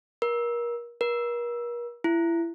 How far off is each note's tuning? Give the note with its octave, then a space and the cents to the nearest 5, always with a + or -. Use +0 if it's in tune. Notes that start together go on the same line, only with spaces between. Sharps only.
A#4 +30
A#4 +40
E4 +25